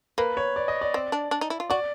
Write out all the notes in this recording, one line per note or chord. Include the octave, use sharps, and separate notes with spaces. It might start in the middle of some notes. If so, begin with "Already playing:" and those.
A#3 B4
C#5
D5
D#5
D5
C4
D4
D4
D#4
E4
F4
F#4 D5